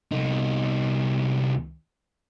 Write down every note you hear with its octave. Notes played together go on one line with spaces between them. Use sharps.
C2 D#4